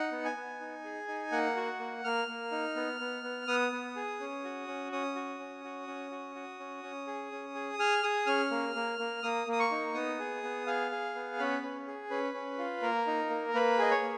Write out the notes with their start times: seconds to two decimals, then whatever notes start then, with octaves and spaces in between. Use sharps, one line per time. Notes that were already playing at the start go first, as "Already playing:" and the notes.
Already playing: D#4 F#5
0.12 B3
0.25 G#5
0.37 B3
0.61 D#4
0.84 G#4
1.08 D#4
1.32 A#3 F#5
1.56 F#4
1.79 A#3
2.04 A#3 F6
2.28 A#3
2.52 D#4
2.76 B3
3.00 B3
3.24 B3
3.48 B3 D#6
3.72 B3
3.96 G#4
4.20 C#4
4.44 F#4
4.68 C#4
4.92 C#4 D#6
5.16 F#4
5.39 C#4
5.64 F#4
5.87 C#4
6.11 F#4
6.35 F#4
6.60 C#4
6.83 C#4
7.07 G#4
7.32 C#4
7.55 G#4
7.79 G#4 F6
8.03 G#4 D#6
8.27 C#4 F6
8.51 A#3
8.75 A#3
8.99 A#3
9.23 A#3 D#6
9.47 A#3 D#6
9.60 C#6
9.71 D#4
9.94 B3 D#6
10.19 G#4
10.43 B3
10.67 G#4 F5
10.91 G#4
11.15 B3
11.39 C#4 B4
11.63 C#4
11.87 G#4
12.10 C#4 B4
12.34 C#4
12.58 F4
12.82 A#3 A#4
13.07 D#4
13.30 A#3
13.54 A#3 B4
13.78 G#4 D#5
13.91 C#5
14.02 A#3